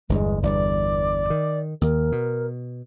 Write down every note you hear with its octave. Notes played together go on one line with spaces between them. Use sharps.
G1 E2 G2 G#3
G1 E2 G2 D5
D#3
D#2 A#4
B2